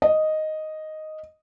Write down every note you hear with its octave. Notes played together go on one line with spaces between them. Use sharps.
D#5